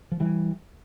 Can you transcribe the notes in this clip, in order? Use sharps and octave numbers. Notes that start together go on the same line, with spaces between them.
F3
E3 G3